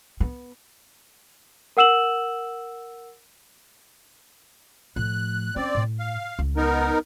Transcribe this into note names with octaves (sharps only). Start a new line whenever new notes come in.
B3
A#4 F#5 E6 E7 F#7
A2 F3 F#6
C4 C#4 D5
A2
F5
C#2
B3 D#4 A#4